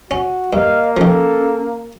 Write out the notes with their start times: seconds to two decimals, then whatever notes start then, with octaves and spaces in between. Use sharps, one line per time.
0.11 C#4 F#4
0.53 G2 A#3 D#5 F5
0.97 D#3 F3 C#4 A4